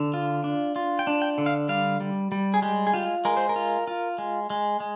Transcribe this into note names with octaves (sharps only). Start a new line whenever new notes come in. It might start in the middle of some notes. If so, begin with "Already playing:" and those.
Already playing: D3
F4
D4
F4
G5
D4
G5
D3
F5
G3 F5
G3
G3
G#4
G#3 G4
G#4
F4 G4
G#3 A#4
C5
A#4
F4
F4
G#3
G#3
G#3